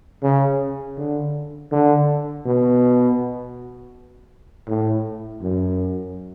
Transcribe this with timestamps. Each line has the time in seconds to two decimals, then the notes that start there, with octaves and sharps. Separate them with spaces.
0.23 C#3
0.97 D3
1.72 D3
2.46 B2
4.68 A2
5.42 F#2